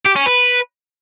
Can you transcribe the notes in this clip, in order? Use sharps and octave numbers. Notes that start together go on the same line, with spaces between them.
G4
C#4
B4